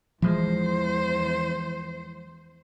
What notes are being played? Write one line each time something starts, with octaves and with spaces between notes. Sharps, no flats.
E2 E3 F3 G#3 C5